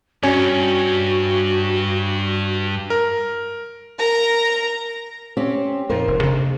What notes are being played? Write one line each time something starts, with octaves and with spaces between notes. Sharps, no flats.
G2 C#4 F#4
A#4
A#4 A#5
C4 C#4 G4
F2 A#2 D#4 A#4 C5
F1
C3 A#3 D4